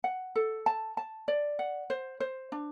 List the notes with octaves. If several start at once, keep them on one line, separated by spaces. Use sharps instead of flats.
F#5
A4
A5
A5
D5
F#5
C5
C5
D4